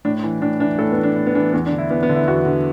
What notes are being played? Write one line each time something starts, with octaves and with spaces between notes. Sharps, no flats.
A2 D4
E3
A2 D4
E3 D4
A2 A4
B3
E3
D4
A2
B3
E3 D4
E2 B3
D4
D3
E4
E2 B3
B3
D3
E4
E2 F#4
D3